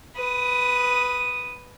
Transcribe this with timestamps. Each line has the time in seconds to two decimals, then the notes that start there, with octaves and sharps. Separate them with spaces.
0.16 B4 D#6